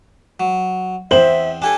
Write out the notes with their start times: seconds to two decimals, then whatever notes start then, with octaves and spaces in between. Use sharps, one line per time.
0.40 F#3
1.11 E2 C4 C5 E5 F#7
1.62 D4 G4 A4 G#5